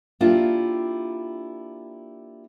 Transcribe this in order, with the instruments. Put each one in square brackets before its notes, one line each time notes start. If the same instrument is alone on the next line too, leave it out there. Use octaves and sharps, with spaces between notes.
[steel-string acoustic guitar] A#3 D4 E4 F4 G4